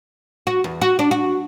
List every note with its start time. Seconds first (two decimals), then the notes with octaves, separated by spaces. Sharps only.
0.47 F#4
0.64 E2
0.81 F#4
0.99 D4
1.11 F#4